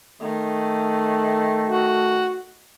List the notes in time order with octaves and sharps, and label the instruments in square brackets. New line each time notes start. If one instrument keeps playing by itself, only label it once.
[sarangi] D#3 [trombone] A3
[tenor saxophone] F#4